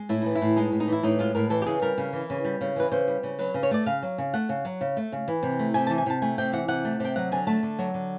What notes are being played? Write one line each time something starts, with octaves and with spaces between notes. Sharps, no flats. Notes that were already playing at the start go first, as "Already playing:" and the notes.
Already playing: G#3
A2 E4
E3 D#4
E4
A2
G#3 D#4
A2
D#4
E3
E4
A2 D#4
G#3 F4
A2 A#4
E3 A4
G4
C#3 G#4
G3 A#4
C#3
E3
C#3
G3
C#3
E3 B4
C#3 C5
G3
C#3
F#3 B4
C#3
C#5
A3 D5
C#3 F5
F#3
C#3
A3 F#5
C#3
F#3
C#3
A3
C#3
E3
C3
A3
C3 G#5
E3 A5
G#5
C3 A5
A3 G#5
C3 G5
E3 F#5
C3 F#5
A3
C3 G5
F#3 F#5
D3 G#5
A3 A5
D3
F#3
D3